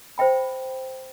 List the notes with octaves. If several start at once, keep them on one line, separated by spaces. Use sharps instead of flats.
C5 E5 G5 B5